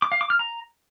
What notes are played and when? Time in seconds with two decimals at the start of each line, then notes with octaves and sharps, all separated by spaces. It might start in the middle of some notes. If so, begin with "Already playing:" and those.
0.02 D6
0.12 F5
0.21 D6
0.30 F6
0.39 A#5